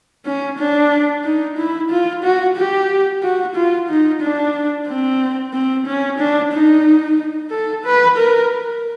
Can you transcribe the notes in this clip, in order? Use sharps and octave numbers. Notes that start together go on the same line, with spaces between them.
C#4
D4
D#4
E4
F4
F#4
G4
F#4
F4
D#4
D4
C4
C4
C#4
D4
D#4
A4
B4
A#4